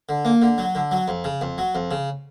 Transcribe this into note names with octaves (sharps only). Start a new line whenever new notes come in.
D3
A#3
D3
F#3
D3
F#3
F2
C#3
F2
F#3
F2
C#3